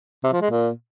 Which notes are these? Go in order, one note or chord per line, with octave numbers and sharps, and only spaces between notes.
C3
F3
G#3
A#2